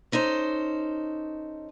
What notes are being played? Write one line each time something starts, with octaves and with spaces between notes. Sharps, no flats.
C#4 D#4 A4 C5